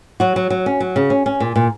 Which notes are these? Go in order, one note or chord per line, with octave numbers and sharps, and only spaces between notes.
F#3 F#4
F#3
F#3
C#4
F#3
C#3
C#4
C#4
A#2
A#2